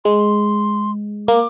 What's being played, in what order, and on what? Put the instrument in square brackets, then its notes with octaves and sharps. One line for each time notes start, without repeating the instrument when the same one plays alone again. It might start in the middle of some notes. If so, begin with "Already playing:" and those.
[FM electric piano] G#3 [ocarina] C6
[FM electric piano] A#3 [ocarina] D6